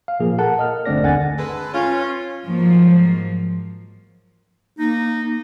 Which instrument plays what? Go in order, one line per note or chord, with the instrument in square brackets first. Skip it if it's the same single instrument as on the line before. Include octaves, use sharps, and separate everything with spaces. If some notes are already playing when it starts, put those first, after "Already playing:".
[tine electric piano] F5
A#2 F3 A#3 G#4
A4 A#4 F#5 A5
A#4 D#5 F6
G1 D3 A3 C4 D5 A#6
G1 D#2 D3 F#5 G#5 A6
[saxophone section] G#3 A4 B4
[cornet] C#4 [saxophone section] F4
[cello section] G#2 F3 F#3 A#3
[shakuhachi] A#3 [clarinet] D#4